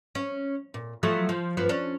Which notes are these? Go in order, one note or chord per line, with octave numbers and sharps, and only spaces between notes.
C#4
A#2
F3 F#3 A3
F3
G2 F3 B3
C#4 D4